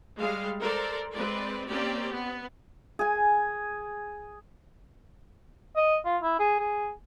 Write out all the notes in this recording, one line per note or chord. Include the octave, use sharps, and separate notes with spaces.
G3 G#3 F5
A4 A#4 C5 D5
G#3 C4 B4 D5
A#3 C4 C#4 G4 D5
B3
G#4 G#5
D#5
F4
E4
G#4
G#4